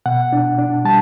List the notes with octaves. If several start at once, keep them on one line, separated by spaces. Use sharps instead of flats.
B2 F#5
D4
D4
G3 A5